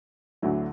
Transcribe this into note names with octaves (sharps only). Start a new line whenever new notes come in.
D2 D3 F#3 A3 E4